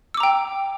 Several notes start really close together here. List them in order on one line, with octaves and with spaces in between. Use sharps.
E6 D6 A#5 G5